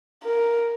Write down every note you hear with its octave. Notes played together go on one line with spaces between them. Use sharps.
A#4